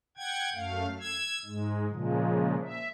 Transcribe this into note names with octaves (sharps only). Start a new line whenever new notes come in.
F#5 G5 G#6
F#2 A3 F5
E6 G#6
G#2 G#3
A#2 C#3 F3 G#3
E5